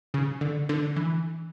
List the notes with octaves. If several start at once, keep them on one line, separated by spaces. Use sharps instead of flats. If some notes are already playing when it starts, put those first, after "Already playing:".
C#3
D3
D3
E3